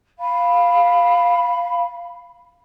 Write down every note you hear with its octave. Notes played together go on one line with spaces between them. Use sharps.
F5 B5